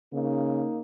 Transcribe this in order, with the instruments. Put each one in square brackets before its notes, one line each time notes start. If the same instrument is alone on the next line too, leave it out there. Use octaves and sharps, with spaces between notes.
[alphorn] C#3 [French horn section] A#3 D#4